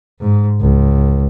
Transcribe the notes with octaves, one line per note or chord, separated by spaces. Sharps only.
G#2
C#2